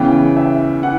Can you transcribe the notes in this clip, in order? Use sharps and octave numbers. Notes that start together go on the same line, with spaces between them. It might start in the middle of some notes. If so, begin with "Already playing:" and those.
Already playing: E2 C#3 E3 G5
E5
E3 F#5